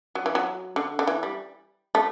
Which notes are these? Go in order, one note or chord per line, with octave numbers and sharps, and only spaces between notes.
F#3
E3
F#3
D3
D3
E3
G3
A3